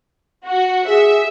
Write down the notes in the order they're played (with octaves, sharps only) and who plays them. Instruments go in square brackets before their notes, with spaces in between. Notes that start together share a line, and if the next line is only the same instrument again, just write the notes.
[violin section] F#4
[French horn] G#4 [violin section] E5